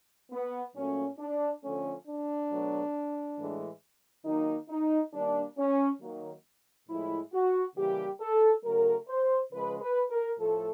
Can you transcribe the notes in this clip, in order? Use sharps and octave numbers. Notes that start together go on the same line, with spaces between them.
B3
A#2 F#3 A3 C#4
D4
D3 F3 A3 C#4
D4
B2 F#3 A3
A2 E3 G#3
D#3 F#3 A#3 D#4
D#4
D#3 G3 A#3 D4
C#4
D#3 F#3 A#3
A2 F3 G#3 E4
F#4
C#3 E3 G3 A#3 G4
A4
C#3 F#3 A3 A#4
C5
C#3 F3 G#3 B4
B4
A#4
A2 F3 A3 A4